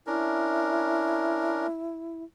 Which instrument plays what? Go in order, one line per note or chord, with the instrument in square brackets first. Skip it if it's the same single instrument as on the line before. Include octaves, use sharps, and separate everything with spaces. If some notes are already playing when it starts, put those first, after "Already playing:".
[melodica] C#4 D4 A#4 [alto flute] E4